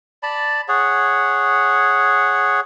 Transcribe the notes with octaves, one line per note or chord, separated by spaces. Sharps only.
D5 A5 B5
G#4 C#5 F#5